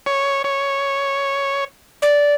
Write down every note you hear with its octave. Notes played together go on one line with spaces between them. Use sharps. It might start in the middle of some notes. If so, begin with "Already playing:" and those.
C#5
C#5
D5